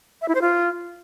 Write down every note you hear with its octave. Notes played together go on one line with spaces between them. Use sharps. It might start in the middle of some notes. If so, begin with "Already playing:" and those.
E5
E4
C5
F4